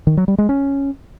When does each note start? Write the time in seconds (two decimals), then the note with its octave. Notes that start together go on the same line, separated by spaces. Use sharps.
0.07 D#3
0.17 F#3
0.28 G3
0.38 G#3
0.49 C#4